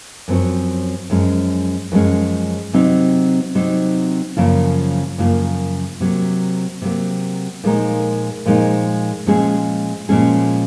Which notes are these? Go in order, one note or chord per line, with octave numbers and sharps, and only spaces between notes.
F#2 F3 C4 F#4 C#5
F#2 F3 G#3 C#4
F#2 F3 G#3 C#4
C3 F#3 C4 D#4
C3 F#3 C4 D#4
F#2 C#3 F3 A#3 F4
F#2 C#3 F3 A#3 F4
C3 F#3 A#3
C3 F#3 A#3
A#2 F3 G#3 D#4 A#4
A#2 F3 G#3 D#4 A#4
A#2 F3 G#3 C#4 G#4
A#2 F3 G#3 C#4 G#4